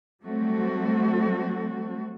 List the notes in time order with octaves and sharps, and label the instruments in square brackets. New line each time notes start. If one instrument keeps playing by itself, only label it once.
[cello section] F#3 G3 A3 C4 F#4 A4